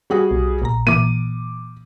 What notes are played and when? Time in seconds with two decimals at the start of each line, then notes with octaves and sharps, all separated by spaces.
0.10 G3 F#4 G#4
0.31 B1
0.62 A1 A#2 A#5
0.87 A#2 E3 A#3 D6 D#7